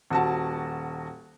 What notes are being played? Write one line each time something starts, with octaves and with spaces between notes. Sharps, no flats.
D#1 F#4 A5